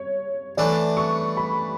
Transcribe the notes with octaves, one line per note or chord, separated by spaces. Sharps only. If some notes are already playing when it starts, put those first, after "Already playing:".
Already playing: C#5
E3 A3 D4 D5
C#6
B5